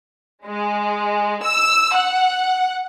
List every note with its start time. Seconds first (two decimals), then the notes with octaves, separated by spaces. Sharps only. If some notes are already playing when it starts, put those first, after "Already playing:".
0.46 G#3
1.44 E6
1.95 F#5